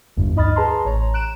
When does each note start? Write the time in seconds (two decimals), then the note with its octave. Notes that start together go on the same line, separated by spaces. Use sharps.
0.17 G1 E2 G2
0.36 D2 D#4 D#5 B5 F6 A6
0.56 G#4 B4 A5 A#5 C6
0.85 A1 C#5 A#5
1.14 F#6 D7 E7